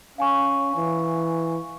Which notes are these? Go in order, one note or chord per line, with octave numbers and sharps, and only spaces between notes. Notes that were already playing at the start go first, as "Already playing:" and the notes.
C#4 F5 G#5 C#6
E3